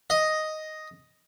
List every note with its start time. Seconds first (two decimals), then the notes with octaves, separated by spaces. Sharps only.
0.10 D#5